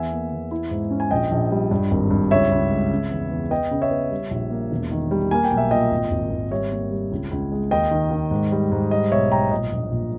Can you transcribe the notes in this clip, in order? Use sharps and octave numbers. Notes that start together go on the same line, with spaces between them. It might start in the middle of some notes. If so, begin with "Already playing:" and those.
Already playing: E2 E5 G#5
A#3
E2
E4
G#2
C#4
G#5
A#1 D#5 G5
A#1
G3
G2
G#1
G2
C#2 C#5 E5
C#2
G#3
C#3
E2
E2
B3 D#5 G5
C#3
C#5 E5
B3
G3
A#1
A#3
E1
D#3
G3
A#3 G#5
G5
B1
E5
A#2 D#5 G5
G#1
G#1
G#1
G3 C#5 E5
A#3
G3
C#2
C#2
G#3
D#2 D#5 G5
D#3
D#3
G#2
G3
G#2
G3 D#5
B1 C#5 E5
B1 G5 A#5
A#2 D#5
A#1
A#2